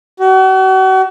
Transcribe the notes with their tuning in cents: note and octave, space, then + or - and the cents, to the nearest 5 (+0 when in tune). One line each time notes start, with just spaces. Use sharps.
F#4 +40